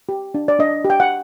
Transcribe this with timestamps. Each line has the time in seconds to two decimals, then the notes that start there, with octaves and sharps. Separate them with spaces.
0.09 G4
0.34 D4
0.48 D5
0.59 D4 D#5
0.85 G4
0.90 G5
1.00 F#5